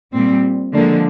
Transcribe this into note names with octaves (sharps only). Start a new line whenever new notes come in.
A#2 G3 C4
D3 F3 G#3 A#3